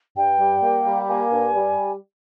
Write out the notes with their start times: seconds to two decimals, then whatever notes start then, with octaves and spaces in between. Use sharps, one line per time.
0.16 G2 G5
0.40 G3
0.62 A#3
0.86 G3
1.09 A#3 G#5
1.32 G2
1.55 G3